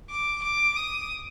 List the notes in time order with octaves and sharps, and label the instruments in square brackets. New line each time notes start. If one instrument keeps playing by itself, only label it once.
[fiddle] D6
D6
D#6